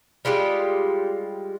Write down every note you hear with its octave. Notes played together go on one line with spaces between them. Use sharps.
G3 G#3 F4 G4